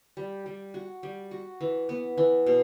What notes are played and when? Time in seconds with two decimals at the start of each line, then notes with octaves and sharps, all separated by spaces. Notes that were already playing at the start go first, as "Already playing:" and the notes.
0.17 G3
0.46 G3
0.74 F#4
1.03 G3
1.31 F#4
1.61 E3
1.89 B3
2.18 E3
2.47 B2